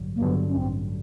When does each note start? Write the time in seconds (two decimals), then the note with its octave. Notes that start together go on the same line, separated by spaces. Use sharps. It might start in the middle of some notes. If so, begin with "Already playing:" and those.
Already playing: A1 G2 D3 F#3
0.16 A#3
0.21 G2 D3 F#3 B3
0.49 C#4
0.57 A1 C4